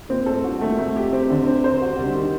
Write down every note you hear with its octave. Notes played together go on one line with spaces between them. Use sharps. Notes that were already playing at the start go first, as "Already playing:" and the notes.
A#2 C4
A2 A4
G2 F#4
A#2 A3
C3 A3
G4
C4
D3
C4
C5
F#4
C3 G3
D3
D#3 G3